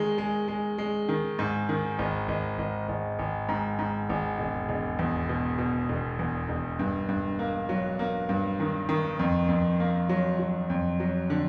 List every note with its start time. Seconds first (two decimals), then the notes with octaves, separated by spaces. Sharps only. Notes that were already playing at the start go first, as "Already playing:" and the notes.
Already playing: D#3 G#3
0.18 G#3
0.48 G#3
0.78 G#3
1.09 D#3
1.39 G#2
1.69 D#3
1.99 G#1
2.28 G#1
2.58 G#1
2.89 G#1
3.19 G#1
3.49 G#2
3.79 G#2
4.09 G#1
4.38 E1
4.69 E1
4.99 E2
5.29 B2
5.58 B2
5.89 E1
6.19 E2
6.49 E1
6.79 G2
7.09 G2
7.39 A#3
7.69 F#3
7.99 A#3
8.29 G2
8.60 D#3
8.89 D#3
9.19 F2
9.49 F2
9.80 A#3
10.09 F#3
10.39 F#3
10.70 F2
11.00 F#3
11.30 D3